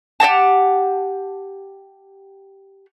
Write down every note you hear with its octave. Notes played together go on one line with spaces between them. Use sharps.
G4 D#5 F#5 A5